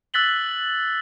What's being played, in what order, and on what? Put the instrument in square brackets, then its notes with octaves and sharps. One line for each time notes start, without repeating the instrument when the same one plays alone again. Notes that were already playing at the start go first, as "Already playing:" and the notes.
[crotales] E6 F#6 A6 B6 F#7 G7